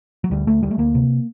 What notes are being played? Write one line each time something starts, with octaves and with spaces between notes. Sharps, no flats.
F#3
D2 G3
D2 A3
D2 G3
A3
D2 A#3
C3